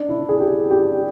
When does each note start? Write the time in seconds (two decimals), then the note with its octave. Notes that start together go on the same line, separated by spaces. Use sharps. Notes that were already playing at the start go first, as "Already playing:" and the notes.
Already playing: D4
0.09 E4
0.29 G#4
0.40 G4
0.71 G4